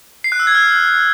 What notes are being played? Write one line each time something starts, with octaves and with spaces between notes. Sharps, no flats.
C7
F#6
E6
G#6
F6